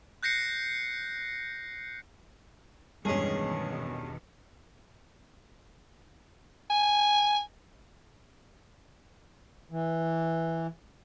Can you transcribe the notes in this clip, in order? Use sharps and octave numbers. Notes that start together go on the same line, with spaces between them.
F#6 G6 A#6 C7 C#7
E2 G2 B2 D#3 G#3 C#4 G#4
G#5
E3